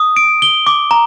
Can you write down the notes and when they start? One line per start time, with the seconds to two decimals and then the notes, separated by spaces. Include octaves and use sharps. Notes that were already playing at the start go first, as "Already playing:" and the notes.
Already playing: D#6
0.16 D7
0.42 G7
0.67 D6
0.91 A#5